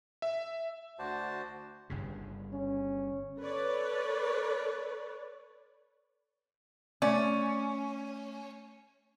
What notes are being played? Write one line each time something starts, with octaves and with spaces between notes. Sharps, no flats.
E5
D2 F#4 C5 D5 A5
G1 G2 C#3
C#4
A4 B4 C#5 D5
A3 C#4 D5